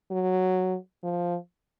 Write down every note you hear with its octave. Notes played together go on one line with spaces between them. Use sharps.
F#3
F3